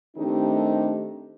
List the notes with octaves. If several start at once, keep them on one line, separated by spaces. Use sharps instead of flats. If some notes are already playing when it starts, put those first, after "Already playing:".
D#3 A3 C4 D4 D#4 G4